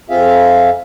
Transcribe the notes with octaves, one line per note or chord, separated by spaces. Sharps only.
F2 C4 F4 G#4 E5 F5